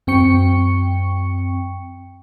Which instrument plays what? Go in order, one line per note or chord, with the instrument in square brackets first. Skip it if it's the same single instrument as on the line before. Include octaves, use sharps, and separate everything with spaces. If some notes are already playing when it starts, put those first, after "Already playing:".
[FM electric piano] F#2 C4 G5 C#6 C#7